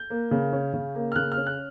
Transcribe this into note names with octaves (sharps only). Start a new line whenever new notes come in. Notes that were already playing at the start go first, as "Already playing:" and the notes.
Already playing: G6
A#3
C#3
C#4
C#3
A#3
F6
C#3 F#6
F6
C#4
F#6